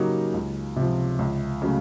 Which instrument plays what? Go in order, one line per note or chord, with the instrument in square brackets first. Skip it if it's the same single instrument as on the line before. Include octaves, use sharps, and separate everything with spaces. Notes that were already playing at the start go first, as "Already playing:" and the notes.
Already playing: [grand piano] C#3 F#3 A#3 D#4 G4
C#2
C3 F3
C#2
C#3 F#3 A3